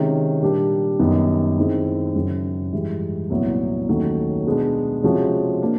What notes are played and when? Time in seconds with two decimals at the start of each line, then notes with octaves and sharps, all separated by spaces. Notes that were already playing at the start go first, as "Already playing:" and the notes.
Already playing: C3 D#3 G#3 C#4
0.42 A#2 G3 A#3 D4 G4
0.99 F#2 D#3 G3 B3 D#4
1.57 D#3 G#3 C4 E4
2.15 F#2 C#3 F#3
2.73 G#2 E3 G3
3.30 C2 A#2 F#3 B3 E4
3.89 D#2 D#3 F#3 A3 C#4
4.46 B2 G#3 B3 D4
5.03 C3 F3 G#3 C#4 F#4
5.62 A#3 D4